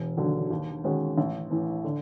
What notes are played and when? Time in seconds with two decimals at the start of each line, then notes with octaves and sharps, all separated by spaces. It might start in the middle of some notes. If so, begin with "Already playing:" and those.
Already playing: E1
0.17 D#2 D3 F#3
0.50 D#2
0.84 D#3 G#3 C#4 F#4
1.18 A1
1.50 A2 E3
1.84 D3